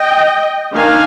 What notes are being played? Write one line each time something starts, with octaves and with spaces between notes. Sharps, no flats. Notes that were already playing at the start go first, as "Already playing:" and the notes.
Already playing: D#5 G5
D#3 A#3 D4 F5 G#5